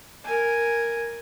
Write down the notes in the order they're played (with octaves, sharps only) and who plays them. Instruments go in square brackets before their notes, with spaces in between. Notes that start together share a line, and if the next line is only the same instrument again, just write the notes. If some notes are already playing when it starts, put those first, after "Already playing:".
[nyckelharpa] A#4 G#5